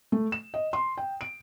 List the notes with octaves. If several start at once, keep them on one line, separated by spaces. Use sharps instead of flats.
A3
E7
D#5
C6
G5
D7